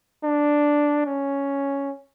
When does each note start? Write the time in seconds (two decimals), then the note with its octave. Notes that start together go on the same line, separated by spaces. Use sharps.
0.24 D4
1.06 C#4